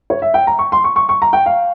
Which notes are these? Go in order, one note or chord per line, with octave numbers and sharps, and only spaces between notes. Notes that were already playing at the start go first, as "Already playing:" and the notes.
C#5
E5
G5
A#5
C#6
C6
C#6
C#6
C#6
A#5
G5
F5